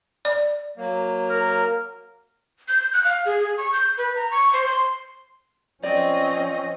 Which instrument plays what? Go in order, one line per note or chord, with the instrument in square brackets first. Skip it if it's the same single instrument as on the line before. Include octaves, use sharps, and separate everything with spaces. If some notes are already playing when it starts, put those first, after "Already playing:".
[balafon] D5
[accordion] F#3 A#3
[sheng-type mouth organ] A#4
[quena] G6
F#6
F5
G#4
G#4
C#6
G6
B4
A#5
C#6
C5
C6
[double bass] F3 C#4 [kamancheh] C4 D#5 [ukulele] D5